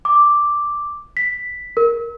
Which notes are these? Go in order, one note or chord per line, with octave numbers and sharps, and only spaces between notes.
D6
B6
A#4